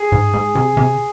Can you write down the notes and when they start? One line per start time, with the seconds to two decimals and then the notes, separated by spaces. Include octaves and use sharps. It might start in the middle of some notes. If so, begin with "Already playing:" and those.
Already playing: G#4
0.12 G#2
0.34 G#2
0.55 C3
0.77 C3